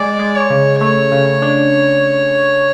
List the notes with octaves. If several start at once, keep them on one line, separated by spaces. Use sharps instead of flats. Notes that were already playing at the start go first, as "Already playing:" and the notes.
Already playing: G#3 D5
G#3
C#5
C#3
A3 C#5
C#3
D4